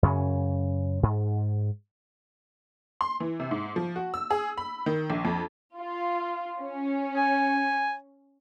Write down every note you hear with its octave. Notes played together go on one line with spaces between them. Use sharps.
F#2 C#3 C#4
G#2
C6
E3
C3
G#2
F3
F#4
E6
G#4
B5
D#3
A#1
F2
F4
C#4
G#5